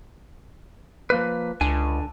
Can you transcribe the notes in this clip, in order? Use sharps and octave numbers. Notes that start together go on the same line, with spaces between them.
F3 A#3 B4
C#2 D3 D4 G#5